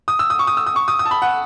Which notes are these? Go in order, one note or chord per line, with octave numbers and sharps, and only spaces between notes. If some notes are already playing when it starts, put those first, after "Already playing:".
D#6
E6
D#6
C#6
D#6
E6
D#6
C#6
D#6
D#6
A5
B5
F#5